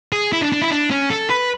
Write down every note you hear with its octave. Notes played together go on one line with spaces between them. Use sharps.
G#4
E4
D4
D4
E4
D4
C#4
A4
B4